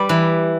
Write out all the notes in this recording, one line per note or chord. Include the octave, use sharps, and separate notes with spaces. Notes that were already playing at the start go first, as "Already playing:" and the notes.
Already playing: G3 B4 D5
E3